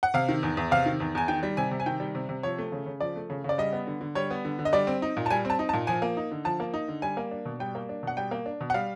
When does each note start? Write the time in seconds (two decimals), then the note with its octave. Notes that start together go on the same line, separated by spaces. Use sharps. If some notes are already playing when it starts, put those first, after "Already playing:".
0.03 F#5
0.14 C3 F5
0.29 D#3
0.43 E2
0.57 E2
0.71 C3 F5
0.86 D#3
1.00 E2
1.15 E2 G#5
1.28 D#3 G5
1.43 G3
1.57 C3 G#5
1.71 C3
1.80 G#5
1.86 D#3 G5
2.00 G3
2.15 C3
2.29 C3
2.43 F3 C#5
2.58 A3
2.72 C#3
2.86 C#3
3.00 F3 D5
3.16 A3
3.30 C#3
3.44 C#3 D5
3.58 G3 D#5
3.73 B3
3.87 D3
4.01 D3
4.15 G3 C#5
4.30 B3
4.45 D3
4.59 D3
4.65 D#5
4.73 G3 D5
4.87 C4
5.02 D#4
5.17 A#2
5.26 A5
5.30 G3 G#5
5.45 C4 A5
5.59 D#4
5.69 A5
5.73 A#2
5.87 F3 G#5
6.02 A#3
6.17 D#4
6.31 D3
6.45 F3 A5
6.60 A#3
6.74 D#4
6.88 D3
7.02 G3 G#5
7.17 A#3
7.31 D4
7.45 B2
7.60 G3 G5
7.75 A#3
7.89 D4
8.03 B2 F#5
8.17 G3 G5
8.31 A#3
8.46 D4
8.61 B2
8.70 F#5
8.74 G3 F5